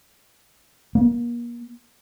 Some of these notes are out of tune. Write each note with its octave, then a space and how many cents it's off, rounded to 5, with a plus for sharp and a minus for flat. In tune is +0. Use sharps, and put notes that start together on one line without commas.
A#3 +35